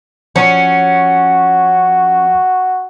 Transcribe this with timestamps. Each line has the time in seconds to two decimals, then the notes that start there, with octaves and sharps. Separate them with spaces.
0.36 F3 C#4 F#4